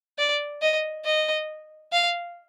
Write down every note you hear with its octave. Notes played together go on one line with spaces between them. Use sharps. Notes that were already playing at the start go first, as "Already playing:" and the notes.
D5
D#5
D#5
F5